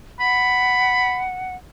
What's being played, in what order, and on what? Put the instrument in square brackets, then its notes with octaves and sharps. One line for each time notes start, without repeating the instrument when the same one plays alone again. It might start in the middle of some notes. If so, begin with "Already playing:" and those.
[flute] F#5 [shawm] B5